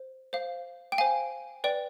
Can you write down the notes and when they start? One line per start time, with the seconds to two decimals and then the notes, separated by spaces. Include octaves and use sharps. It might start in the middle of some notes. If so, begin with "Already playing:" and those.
Already playing: C5
0.33 C5 F5
0.92 G5
0.98 C5 F5 G#5
1.64 B4 D5 G5